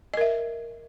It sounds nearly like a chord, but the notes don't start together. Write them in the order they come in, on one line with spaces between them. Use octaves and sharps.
D#5 A#4 E5